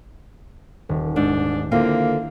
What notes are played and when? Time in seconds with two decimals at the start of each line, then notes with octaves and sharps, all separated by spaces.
0.89 D#1
1.16 G#2 D4
1.72 D3 A#3 C4 E4 F4